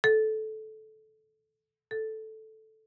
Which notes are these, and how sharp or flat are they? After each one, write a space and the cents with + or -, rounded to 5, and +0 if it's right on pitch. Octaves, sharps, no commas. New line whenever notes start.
A4 -15
A4 -5